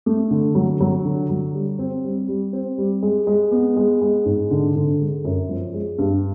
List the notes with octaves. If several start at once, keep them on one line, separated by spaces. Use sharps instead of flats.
A3
D3
F#3
F#3
D3
F#3
G3
C4
G3
G3
C4
G3
G#3
G#3
B3
G#3
G#3
G#2
D3
D3
G#3
F#2
F3
G#3
G2